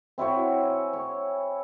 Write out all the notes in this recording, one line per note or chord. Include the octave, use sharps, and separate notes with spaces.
C4 E4 F#4 C#5
G#5
C#5